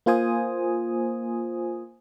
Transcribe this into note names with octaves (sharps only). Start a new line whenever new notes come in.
A#3 F4 C5 G#5 D#6